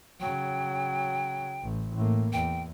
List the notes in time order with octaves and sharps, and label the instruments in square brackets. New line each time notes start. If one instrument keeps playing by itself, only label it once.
[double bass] C#3 F#3 [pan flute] G5
[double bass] A1
A2 A#3
[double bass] E2 [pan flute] G5